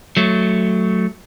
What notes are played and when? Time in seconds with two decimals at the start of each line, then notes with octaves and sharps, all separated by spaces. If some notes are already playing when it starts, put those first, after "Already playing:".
0.17 F#3 A3